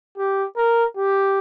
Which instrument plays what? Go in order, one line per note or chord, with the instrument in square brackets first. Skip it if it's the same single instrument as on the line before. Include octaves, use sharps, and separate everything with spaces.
[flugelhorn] G4
A#4
G4